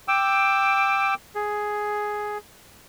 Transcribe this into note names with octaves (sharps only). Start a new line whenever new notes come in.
G5 D6 E6
G#4